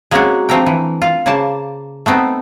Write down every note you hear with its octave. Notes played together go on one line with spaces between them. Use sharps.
G#3 A#3 C4 C#4 F4 F#4
F3 A3 C4 D4 A#4 G5
E3
F4 F5
C#3 A#3 C5 D5 A5
A3 B3 C4 D#4